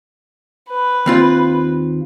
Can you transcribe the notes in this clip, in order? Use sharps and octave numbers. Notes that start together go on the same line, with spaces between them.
B4
D#2 C4 F4